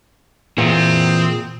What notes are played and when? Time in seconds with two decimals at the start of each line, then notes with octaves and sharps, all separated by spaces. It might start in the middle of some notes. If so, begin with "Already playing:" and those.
0.58 A#2 E3 C4 G#4 F#5